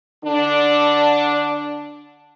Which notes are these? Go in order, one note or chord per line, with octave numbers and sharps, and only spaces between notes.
D3 D4